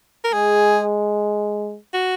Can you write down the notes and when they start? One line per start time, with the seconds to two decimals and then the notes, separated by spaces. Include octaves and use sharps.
0.24 A#4
0.33 G#3 G#4
1.93 F#4